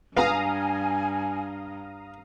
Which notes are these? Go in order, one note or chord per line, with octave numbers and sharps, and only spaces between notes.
C#2 G2 B3 F4 F5 G#5 A#5 D#6